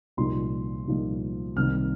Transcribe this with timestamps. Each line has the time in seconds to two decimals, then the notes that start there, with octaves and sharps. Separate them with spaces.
0.17 C2 A#2 F3 A#3 D#4 C6
0.87 C2 A#2 F3 A#3 D#4
1.56 C2 C3 D#3 A#3 D#4 F6